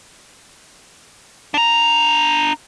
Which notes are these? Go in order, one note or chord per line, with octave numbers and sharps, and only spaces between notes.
D4 A#5